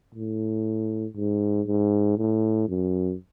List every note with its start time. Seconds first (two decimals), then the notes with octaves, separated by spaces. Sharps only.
0.15 A2
1.16 G#2
1.67 G#2
2.18 A2
2.69 F#2